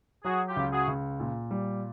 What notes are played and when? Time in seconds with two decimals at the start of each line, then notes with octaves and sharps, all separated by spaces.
0.24 F#3 F#4 G#4
0.48 F4 G4
0.57 C#2
0.72 F#4 G#4
0.88 C#2
1.20 A#2
1.51 G3